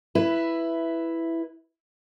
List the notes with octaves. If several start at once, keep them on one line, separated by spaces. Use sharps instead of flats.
E4 B4